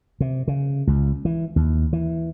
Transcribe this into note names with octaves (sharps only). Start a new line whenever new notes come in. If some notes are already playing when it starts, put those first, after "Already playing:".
C3
C#3
C#2
E3
D#2
E3